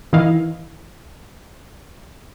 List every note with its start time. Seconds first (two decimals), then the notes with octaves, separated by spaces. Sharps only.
0.13 D#3 E3 E4 D#5 F5